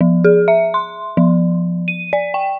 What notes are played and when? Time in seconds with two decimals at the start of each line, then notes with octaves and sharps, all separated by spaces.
0.01 F3
0.24 G#4
0.48 E5
0.74 C6
1.17 F3
1.88 D#7
2.13 D5
2.34 G5